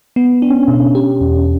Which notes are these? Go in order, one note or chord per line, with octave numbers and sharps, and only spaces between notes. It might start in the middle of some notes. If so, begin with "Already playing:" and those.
B3
D4
C#4
B2
G4
E2